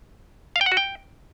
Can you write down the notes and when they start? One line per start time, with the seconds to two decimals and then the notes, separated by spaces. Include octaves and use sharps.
0.56 F5
0.61 G5
0.66 F#5
0.72 F#4
0.77 G5